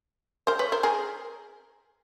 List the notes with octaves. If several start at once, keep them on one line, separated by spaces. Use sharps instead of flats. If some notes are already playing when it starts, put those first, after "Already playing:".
A#4 C5
B4 C#5
A#4 C5
G#4 A#4